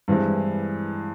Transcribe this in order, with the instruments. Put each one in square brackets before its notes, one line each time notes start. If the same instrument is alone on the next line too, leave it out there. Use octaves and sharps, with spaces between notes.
[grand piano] G2 E3 G#3 C4 E4